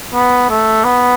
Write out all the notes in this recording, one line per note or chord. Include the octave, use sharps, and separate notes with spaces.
B3
A3
B3